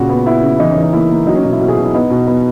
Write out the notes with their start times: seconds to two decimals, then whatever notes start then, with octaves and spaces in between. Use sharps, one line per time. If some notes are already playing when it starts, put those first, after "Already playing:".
Already playing: A#2 C#3 F#4
0.10 B3
0.26 B3 E4
0.42 C#3
0.59 E3 D#4
0.71 E3 C#4
0.82 D#4
0.93 A#3 E4
1.11 A#3
1.27 F#3 D#4
1.35 C#4
1.44 B2 D#4
1.52 E4
1.60 B2
1.68 G#4
1.78 B2
1.85 E4
1.94 B3 D#4
2.10 B2
2.27 B3